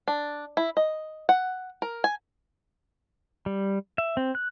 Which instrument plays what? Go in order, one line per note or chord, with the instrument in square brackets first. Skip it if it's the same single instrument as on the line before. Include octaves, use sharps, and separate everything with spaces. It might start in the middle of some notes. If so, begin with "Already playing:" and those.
[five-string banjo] D4
E4
D#5
F#5
A#4
G#5
[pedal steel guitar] G3
E5
C4
F#6